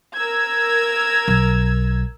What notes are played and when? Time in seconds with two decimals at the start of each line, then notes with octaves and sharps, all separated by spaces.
0.14 A#4 E6 G#6
1.28 B1